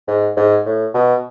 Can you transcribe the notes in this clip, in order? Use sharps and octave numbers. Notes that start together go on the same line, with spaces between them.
G#2
G#2
A2
B2